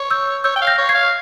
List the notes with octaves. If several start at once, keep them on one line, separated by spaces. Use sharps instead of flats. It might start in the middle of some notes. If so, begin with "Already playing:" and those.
Already playing: C#5
E6 G6
C#5 E6 G6
G5
F5
G6 A#6
C#5
G#6 C7
F5